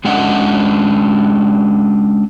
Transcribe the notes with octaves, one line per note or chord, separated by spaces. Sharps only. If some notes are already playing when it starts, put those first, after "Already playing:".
G#3 C#4 D4 D#5 E5 F#5